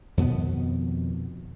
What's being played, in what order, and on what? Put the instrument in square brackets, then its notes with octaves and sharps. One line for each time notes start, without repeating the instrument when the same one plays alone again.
[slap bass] F2 B2 D#3 B3